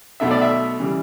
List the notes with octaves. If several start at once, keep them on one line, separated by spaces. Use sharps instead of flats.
B1 B2 A3 E5
D5
E5
C#3 E3 G3